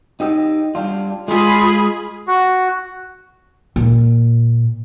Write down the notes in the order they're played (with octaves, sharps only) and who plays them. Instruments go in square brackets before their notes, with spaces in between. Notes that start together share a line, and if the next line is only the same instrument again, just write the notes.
[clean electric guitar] D#4 G4 D#5
G3 D4 F4
[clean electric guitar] G#3 [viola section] F4 G#4 B5
[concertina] F#4
[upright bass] A#2